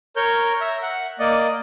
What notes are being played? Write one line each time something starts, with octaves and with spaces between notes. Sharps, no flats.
A#4 C#5 G6
E5 A#5
F#5
A#3 D5 D#5